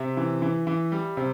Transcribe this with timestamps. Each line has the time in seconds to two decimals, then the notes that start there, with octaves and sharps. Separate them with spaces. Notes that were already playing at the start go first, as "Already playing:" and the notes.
Already playing: C3 E5
0.17 E3
0.42 E3
0.67 E3
0.92 G3
1.17 C3